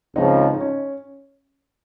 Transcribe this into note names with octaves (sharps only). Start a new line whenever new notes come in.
C#2 C#3 F3 C4 D#4
D#4
C#4